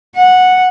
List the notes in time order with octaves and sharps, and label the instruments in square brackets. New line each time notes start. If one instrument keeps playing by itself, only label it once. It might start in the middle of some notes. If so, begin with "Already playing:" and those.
[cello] F#5